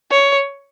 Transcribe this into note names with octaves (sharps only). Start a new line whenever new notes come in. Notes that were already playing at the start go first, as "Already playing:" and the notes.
C#5